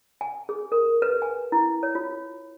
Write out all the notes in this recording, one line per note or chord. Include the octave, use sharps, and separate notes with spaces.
G#5
G#4
A#4
B4
G#5
E4
C#5
F4